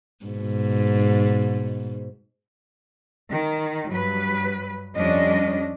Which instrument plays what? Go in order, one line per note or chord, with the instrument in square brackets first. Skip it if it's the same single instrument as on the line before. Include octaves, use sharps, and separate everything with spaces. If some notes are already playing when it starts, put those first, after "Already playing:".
[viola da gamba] G#2 B2
[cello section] D#3
G2 F#3 B4
F2 G3 C#4 D4 D#5